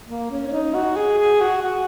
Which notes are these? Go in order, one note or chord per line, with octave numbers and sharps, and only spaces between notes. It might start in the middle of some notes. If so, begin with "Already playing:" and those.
A#3
C#4
C#4
D#4
F#4
G#4
G#4
F#4
F#4